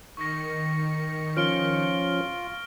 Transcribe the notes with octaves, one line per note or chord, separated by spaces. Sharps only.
D#3 C#6 A#6 C#7
F3 C#4 F4 F6 D7 G7